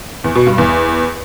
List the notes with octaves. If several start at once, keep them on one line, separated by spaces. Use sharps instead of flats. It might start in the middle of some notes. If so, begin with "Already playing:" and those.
E2
B2
G2
E2